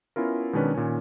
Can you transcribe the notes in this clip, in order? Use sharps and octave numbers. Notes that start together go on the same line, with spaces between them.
B3 C#4 E4 F4 A#4
B2 D#3 G#3 C#4 D4 B4
A#2 D#3 C#4